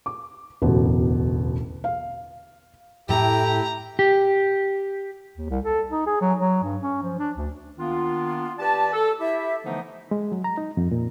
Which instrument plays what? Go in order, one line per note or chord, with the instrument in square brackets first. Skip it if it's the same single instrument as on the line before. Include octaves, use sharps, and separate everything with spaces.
[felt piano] D6
E1 A1 D2 B2
F5
[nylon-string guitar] A2 A3 A4 [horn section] E4 G4 [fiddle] A#5
[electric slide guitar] G4
[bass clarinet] D#2
C2
A4
D#4
G#4
F#3
F#3
G2
C#4
F3
D4
D2
[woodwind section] D#3 A#3 B3 D4 F4
G4 B4 D5 A5
A4
E4 G4 E5
D3 E3 F3 A3 B3 D#4
[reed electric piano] G#3
F#3
A#5
D#4
F2
A#2